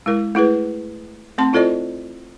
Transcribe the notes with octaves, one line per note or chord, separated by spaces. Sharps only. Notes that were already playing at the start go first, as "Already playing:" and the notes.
G#3 E4 A#4
A3 E4 G#4 B4
A3 C4 A5 C6
E4 F4 A4 C5 D5 D#5